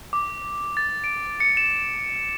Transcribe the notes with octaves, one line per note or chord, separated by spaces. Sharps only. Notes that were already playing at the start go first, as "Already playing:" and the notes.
D6
A6
D7
C#7
E7